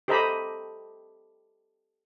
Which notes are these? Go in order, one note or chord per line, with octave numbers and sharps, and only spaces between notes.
G4 A4 C5 D#5 A#5 B5